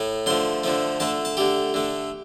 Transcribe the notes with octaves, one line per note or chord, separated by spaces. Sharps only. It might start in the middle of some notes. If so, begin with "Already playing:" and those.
Already playing: A2 A3
D3 F3 A3 C6
D3 F3 A3
D3 A3 A5
A5
D3 A3 G4
D3 A3